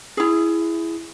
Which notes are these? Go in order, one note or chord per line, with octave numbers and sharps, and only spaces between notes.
E4 G#4